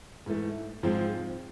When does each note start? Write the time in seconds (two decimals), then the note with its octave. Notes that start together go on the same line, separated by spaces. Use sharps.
0.26 G#2 E3 A3
0.83 G#2 F3 G#3 C4 F4